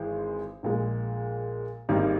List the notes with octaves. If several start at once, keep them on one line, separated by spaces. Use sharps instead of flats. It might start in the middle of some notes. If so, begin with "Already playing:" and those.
Already playing: G#1 E3 G#3
A#1 A#2 G#3
G#1 G#2 G3 A#3